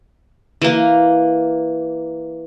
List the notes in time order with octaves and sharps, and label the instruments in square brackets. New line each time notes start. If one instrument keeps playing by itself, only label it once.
[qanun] E3 A#3